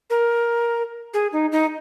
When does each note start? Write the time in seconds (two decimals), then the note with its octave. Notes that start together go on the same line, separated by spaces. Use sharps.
0.10 A#4
1.14 G#4
1.33 D#4
1.52 D#4